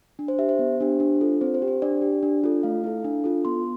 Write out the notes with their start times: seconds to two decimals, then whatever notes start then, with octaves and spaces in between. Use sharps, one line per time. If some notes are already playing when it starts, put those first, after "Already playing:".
0.19 D4
0.28 C5
0.39 G4 E5
0.49 C5
0.59 B3
0.81 D4 G4
1.00 D4
1.21 F4 A4
1.41 C4 C5
1.54 C5
1.62 G4
1.68 C5
1.82 D4 D5
2.02 G4
2.23 D4
2.44 F4 A4
2.63 A3 F5
2.84 E4 A4
3.04 D4
3.24 F4 A4
3.45 B3 C6